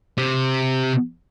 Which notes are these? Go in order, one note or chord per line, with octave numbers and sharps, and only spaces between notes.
C3